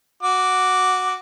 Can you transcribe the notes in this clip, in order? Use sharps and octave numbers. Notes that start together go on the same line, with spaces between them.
F#4 D6